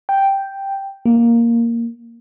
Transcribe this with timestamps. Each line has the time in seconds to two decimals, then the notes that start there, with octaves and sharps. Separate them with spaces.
0.09 G5
1.05 A#3